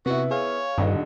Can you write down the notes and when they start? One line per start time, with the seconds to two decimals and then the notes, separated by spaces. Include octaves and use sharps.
0.06 C3 B3 E4 F#4
0.31 G#4 C#5 F5
0.78 D#1 G2 D3 D#4